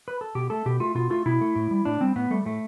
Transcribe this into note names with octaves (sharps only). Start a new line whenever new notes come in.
B4
A4
B2 G4
A3 A4
B2 G4
A3 F4
B2 F4
A3 F4
B2 E4
A3
A2
G3
A2 D4
G3 C4
A2 B3
G3 A3
A2 A3